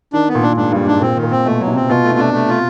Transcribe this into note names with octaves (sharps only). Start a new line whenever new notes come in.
D#3 D4
B3
A#2
D4
G#2 D4
G2 G3
G#2 D4
A#2 C4
D#3
A#2
C4
B2 A3
F#3
C3
C4
B2 F4
A3
C3
D4
A3
F4